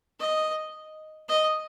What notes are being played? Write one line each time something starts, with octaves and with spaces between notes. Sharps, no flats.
D#5
D#5